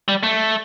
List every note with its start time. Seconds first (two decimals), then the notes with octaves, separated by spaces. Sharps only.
0.08 G3
0.23 A3